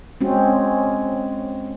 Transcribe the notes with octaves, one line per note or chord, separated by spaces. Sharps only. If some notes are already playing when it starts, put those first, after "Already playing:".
G#3 C4 C#4 F#4